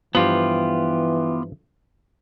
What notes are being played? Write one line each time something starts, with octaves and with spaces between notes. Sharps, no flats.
G2 E3 F3 B3 F4 G4